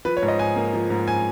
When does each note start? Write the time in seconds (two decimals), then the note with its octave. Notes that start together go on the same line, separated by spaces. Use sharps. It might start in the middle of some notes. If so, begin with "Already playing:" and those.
0.05 F3 B4
0.17 C#5
0.23 G#2
0.28 D#5
0.39 G#2 G#5
0.56 A#3
0.73 F3
0.90 G#2
1.08 G#5